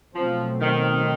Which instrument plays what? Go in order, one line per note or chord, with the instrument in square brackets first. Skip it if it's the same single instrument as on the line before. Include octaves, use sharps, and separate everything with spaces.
[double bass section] B2 F#3 A3 C4 [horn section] F3
[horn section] D#3